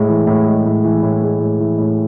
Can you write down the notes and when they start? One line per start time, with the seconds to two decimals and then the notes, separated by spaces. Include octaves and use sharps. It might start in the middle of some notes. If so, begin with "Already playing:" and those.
Already playing: A2 G#3
0.09 E3
0.27 A2
0.46 G#3
0.65 A2
0.84 E3
1.03 A2
1.22 G#3
1.40 A2
1.60 E3
1.78 A2